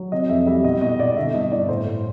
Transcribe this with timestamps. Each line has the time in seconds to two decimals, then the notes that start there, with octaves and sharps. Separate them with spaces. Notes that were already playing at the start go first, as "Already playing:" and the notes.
Already playing: F#3
0.12 C3 D#5
0.29 F2 E5
0.47 G3 E5
0.64 B2 D#5
0.81 B2 D#5
0.99 B2 D5
1.16 D3 E5
1.34 G2 D#5
1.52 G2 D5
1.68 A2 C5
1.86 A2